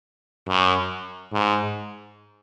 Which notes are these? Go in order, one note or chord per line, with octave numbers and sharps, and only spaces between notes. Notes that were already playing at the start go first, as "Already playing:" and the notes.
F#2
G#2